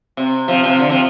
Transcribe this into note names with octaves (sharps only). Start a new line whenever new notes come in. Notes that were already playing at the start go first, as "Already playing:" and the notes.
C3
C3 F3
C3 F3
D3
C3 F3